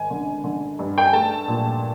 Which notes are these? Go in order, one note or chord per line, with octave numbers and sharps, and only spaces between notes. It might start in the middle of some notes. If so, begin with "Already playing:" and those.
Already playing: G#1 G#5
D3
D3
G2
G5
G#5
A3 A5
A#2